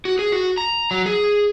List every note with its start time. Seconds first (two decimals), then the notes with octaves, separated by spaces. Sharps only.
0.05 F#4
0.19 G#4
0.32 F#4
0.58 A#5
0.91 F#3
1.06 G#4